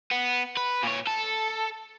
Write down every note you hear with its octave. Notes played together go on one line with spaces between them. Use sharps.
B3
B4
A#2 C#5
A4